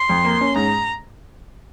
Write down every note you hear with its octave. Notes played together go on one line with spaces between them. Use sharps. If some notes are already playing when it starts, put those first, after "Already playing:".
Already playing: C6
F2
A#3
C#4
G#2 A#5